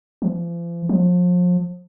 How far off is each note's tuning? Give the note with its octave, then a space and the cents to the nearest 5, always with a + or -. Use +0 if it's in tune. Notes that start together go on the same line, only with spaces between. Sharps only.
F3 -40
F3 +35